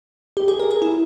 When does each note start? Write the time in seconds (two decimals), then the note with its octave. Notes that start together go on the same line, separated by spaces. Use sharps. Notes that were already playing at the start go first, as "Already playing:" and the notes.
0.37 G4
0.48 G#4
0.59 A#4
0.71 G#4
0.82 E4